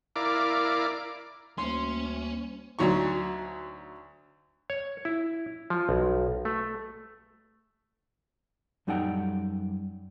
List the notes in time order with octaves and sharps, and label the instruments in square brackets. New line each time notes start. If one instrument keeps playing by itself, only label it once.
[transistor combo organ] E4 A#4 D5 F5 D6
[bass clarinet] D2 [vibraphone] G3 A#3 C5 [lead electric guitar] C#4 [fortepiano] C6
[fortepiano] D2 F#3 D#4 C#6
[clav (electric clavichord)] C#5
E4
F3
B1
A3
[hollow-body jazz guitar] F#2 G3 D#4 A4 F#5 G5